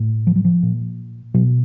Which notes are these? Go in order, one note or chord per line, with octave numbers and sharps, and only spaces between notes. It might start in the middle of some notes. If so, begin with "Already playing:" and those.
Already playing: A2
F3
F#3
F3
A#2
B2 F#3